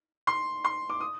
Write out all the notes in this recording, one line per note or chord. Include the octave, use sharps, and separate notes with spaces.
C6
C6
D6
D#6